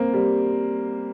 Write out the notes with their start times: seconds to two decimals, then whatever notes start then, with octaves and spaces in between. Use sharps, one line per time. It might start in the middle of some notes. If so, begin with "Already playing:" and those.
Already playing: A#3 C4
0.14 G3